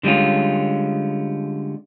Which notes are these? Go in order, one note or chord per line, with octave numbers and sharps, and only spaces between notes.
D3 G3 G#3 C#4 F4